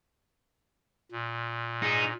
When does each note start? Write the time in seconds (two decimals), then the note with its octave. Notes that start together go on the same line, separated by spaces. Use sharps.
1.12 A#2
1.82 D#4 G#4